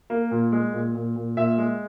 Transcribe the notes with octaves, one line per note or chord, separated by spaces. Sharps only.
A#3
A#2
G#3
A#2
A#2
A#2
A#2 E5
G#3